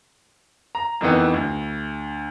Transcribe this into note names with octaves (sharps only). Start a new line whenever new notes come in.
A#5
F2 D#3 E3 B3
D2